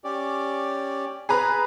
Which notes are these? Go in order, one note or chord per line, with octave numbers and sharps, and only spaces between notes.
C#4 G4 D5
G#4 B4 A#5